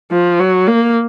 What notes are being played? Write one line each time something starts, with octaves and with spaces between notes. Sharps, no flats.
F3
F#3
A#3